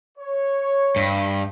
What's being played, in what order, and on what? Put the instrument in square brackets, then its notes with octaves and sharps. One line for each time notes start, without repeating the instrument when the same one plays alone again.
[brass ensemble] C#5
[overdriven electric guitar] G2